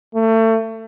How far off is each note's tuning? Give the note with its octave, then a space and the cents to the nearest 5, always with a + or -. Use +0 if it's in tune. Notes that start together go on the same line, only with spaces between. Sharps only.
A3 +30